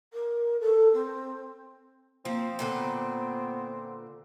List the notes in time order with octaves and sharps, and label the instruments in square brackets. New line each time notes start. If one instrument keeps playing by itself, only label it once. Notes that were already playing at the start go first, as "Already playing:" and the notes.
[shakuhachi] A#4
A4
C4
[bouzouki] F3 [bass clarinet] A#3 [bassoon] C4
[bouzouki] A#2 D3 B4 [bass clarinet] B3